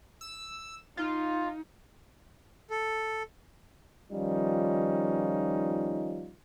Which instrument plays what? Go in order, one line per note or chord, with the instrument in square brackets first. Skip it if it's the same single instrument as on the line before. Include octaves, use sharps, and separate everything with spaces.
[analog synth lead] E6
[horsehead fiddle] D#4 [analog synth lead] F4
[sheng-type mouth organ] A4
[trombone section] D#3 F3 G3 C#4 D#4 F4